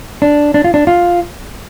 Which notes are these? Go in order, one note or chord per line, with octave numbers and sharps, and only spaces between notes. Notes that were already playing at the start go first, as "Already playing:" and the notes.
D4
D4
F4
D4
F4